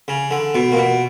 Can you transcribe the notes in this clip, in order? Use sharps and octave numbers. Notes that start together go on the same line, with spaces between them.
C#3
D3
B2
A#2
B2